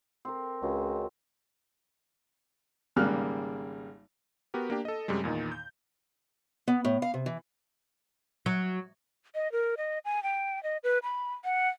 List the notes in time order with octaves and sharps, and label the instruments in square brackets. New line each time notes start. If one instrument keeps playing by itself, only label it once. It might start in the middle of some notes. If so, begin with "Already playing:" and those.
[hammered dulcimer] C4 A#4
[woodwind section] C#2 [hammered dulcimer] F#4
[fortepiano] G#1 C#3 G3 A#3 F6 F#6
[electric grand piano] B3 F#4 G4 A#4
A#3 D4 G4
A4 D#5
F#2 C3 G3 G#3
E2 A#2 D#3 D#4
G6
[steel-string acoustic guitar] B3
A2
F5
C3
E3
[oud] F#3
[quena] D#5
A#4
D#5
G#5
G5
D#5
B4
B5
F#5